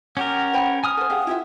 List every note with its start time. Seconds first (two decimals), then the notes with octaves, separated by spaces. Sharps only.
0.17 C#4 G4 A#4 F#5
0.54 C5 G5 B5
0.84 G#5 D#6 F6
0.97 A4 C5 F#5
1.10 G4 G#4 F5 F#5
1.27 E4 F4 G4 E5